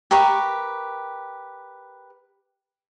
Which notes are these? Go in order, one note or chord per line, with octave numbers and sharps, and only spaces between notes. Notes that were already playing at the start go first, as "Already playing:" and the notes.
G4 A#4 B4 C#6